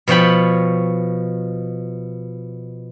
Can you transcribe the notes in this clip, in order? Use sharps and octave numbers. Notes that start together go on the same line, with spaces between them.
B2 F3 C#5 G5 B5